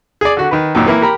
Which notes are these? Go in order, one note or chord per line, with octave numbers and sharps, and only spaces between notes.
G#4 D5
D3 F#4
D#3 B4
F#2 A#2 D#3
E3 A#3 E4
G4 A#4 A#5 B5